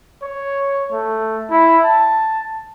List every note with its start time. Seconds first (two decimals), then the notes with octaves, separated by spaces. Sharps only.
0.23 C#5
0.91 A3
1.50 E4
1.85 A5